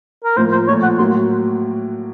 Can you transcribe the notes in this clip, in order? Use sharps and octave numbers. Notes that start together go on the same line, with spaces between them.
A#4
A2 F3 A#3 C5
C5
A#2 F3 A3 C#5
F#5
A2 F#3 A#3 C6